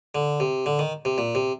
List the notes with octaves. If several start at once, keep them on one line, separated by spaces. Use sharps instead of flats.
D3
C3
D3
D#3
C3
A#2
C3